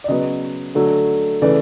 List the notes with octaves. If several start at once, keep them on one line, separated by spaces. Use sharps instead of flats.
D5
C#3 F#3 B3 D#5
D3 F#3 A3
C#3 E3 A3 D5